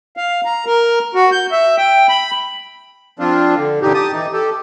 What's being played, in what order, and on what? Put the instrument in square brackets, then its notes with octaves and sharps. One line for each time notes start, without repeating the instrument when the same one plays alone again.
[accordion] F5
A#5
A#4
F#4
G6
E5
G5
B5
F3 C4 D4 F4
D3
G2 A#2 D3 E3 D#4 G4
G4 A5 D#6
E3 D#4
G4 A4